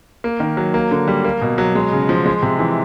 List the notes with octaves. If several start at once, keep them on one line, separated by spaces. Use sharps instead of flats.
A#3
D#3
F#3
A#3
D3
G3
A#3
B2
F#3
G#3
C#3
F3
G#3
C3
E3